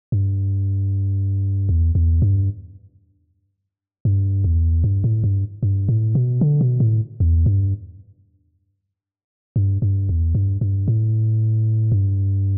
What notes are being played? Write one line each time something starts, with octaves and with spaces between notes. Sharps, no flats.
G2
E2
E2
G2
G2
E2
G2
A2
G2
G2
A2
B2
D3
B2
A2
E2
G2
G2
G2
E2
G2
G2
A2
G2